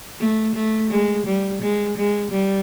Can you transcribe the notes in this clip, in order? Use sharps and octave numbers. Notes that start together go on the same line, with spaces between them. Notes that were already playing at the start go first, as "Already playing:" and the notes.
A3
A3
G#3
G3
G#3
G#3
G3